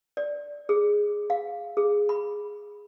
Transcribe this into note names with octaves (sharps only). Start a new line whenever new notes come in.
D5
G#4
F5
G#4
B5